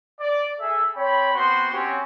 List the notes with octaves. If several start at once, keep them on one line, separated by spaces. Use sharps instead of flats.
D5
G#4 A4 E5
C4 C#5 G5 B5
B3 C4 F#4 C5 C6
C4 C#4 F#4 G4 C#5